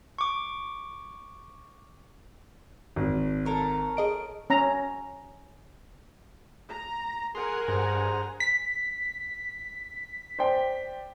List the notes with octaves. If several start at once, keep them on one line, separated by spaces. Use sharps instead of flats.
C#6 D6
G#1
A4 A#4 C#5
G#4 D#5 D7
C#4 A#5
A#5
G#4 A#4 F#5 G#5 A#5 C6
G2 G#4 C5 A#5
B6
C5 D5 G5